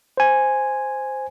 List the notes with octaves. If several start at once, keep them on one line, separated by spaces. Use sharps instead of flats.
C5 G#5